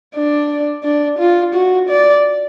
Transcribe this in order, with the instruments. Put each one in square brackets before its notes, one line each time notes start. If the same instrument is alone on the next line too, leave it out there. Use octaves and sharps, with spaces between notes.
[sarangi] D4
D4
F4
F#4
D5